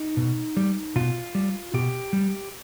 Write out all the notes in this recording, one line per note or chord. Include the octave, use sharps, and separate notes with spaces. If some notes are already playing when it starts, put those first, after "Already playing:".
Already playing: D#4
B2
G3
B2 F4
G3
B2 G4
G3